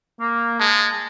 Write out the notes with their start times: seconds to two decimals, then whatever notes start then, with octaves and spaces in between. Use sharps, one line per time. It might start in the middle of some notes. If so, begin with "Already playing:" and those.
0.21 A#3
0.60 G#3 A5